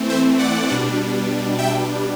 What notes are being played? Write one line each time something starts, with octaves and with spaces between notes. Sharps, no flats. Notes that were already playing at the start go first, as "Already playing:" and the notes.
Already playing: E3 A3 C4
C5 E5
D5 F#5
B2 G3 D4
E5 G5